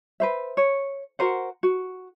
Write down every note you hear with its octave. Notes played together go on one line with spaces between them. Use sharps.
B4 C5 E5
C#5
F#4 A#4 C5 F#5
F#4